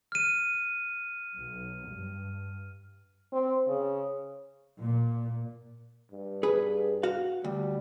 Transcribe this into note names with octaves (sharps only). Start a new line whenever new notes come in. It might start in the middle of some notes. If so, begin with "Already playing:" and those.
F6 D#7
B1
G2
C4
C#3
A#2
G2
G#4 B4
F#4 F5
D2 G3